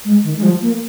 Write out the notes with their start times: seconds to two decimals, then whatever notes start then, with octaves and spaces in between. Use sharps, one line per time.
0.05 G#3
0.24 D#3
0.37 G#3
0.43 F3
0.62 A#3